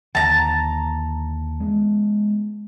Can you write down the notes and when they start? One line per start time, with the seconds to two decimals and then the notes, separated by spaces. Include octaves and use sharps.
0.15 D#2 D3 A5 A#5
1.60 G#3 B3